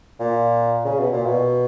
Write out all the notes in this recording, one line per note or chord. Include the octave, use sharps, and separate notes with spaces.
A#2
C#3
B2
A#2
B2